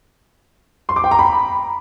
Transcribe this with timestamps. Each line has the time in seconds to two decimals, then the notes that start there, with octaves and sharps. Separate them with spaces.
0.89 C6
0.96 D6
1.04 G5
1.11 A#5
1.19 B5